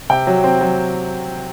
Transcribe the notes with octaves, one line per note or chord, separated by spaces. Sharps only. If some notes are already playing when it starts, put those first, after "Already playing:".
C3 G5
F#3
C4
F#3